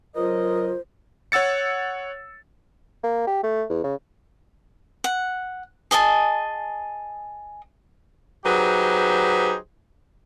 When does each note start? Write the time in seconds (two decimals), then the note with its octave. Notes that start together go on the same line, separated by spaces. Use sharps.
0.16 C#2 F#3 F4 A#4 C5 D#5
1.32 C#5 F#5 E6 A6 C#7
3.04 A#3
3.27 G4
3.43 A3
3.70 E2
3.84 C#3
5.04 F#5
5.91 G#4 D#5 G#5 A5
8.45 F#3 D#4 G4 G#4 B4 C5